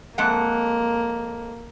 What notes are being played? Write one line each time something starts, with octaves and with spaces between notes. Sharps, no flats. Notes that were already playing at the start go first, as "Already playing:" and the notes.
F2 G#3 A#3 F#5